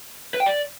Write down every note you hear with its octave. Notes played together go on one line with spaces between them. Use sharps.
B4
G5
D5